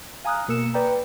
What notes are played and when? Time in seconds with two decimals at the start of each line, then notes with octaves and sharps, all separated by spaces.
0.24 F5 G#5 A#5 D#6 F6 F#6
0.48 B2 A#3 A#4 E6 C#7 E7
0.74 B4 D5 G5 A#5